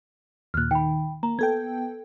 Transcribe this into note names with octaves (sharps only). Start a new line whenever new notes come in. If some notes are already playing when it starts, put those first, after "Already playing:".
D#2 A#2 F6 F#6
D#3 G5 B5
A#3 A#5
B3 A4 G5 G#6